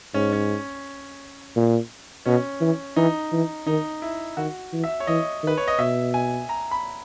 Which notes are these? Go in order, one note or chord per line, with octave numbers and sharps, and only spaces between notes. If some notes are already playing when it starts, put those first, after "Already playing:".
G#2 C#4
C#4
A#2
B2 C#4
E3
E3 D#4
E3
D#3 D#4
E4
D#3 F#4
E3
E5
C#5
E3 D#5
D#3 B4
C#5
D#5
B2 E5
G#5
A#5
B5